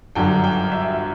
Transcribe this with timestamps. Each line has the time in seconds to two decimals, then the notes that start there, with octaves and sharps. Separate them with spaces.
0.15 G1 F#2 D3 G5
0.44 G5
0.72 E5